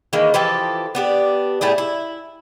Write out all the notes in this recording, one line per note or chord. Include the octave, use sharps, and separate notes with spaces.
D#3 E3 G#3 A#3
E3 F3 G4 A4
B3 D4 G4
A2 G3 E4 G#4
E4